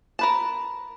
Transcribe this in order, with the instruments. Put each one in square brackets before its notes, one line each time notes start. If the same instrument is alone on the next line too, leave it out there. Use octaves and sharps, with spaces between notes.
[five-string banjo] A#4 B4 A5